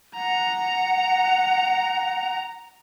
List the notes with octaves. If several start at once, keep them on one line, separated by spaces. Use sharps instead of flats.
F#5 A#5